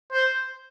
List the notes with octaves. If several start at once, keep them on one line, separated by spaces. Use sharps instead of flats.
C5